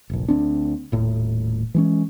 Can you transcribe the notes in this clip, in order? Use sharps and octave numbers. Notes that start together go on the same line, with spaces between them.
F1 A#1
D2 C4 D4
D#1 A2
E3 G#3 C#4